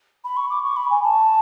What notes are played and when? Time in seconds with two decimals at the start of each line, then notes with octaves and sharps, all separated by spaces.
0.24 B5
0.37 C#6
0.50 D6
0.64 C#6
0.76 B5
0.90 G#5
1.04 A5